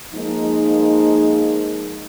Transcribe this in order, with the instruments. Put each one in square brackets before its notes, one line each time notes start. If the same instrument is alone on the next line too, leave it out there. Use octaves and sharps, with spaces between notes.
[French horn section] F3 G#3 A#3 D#4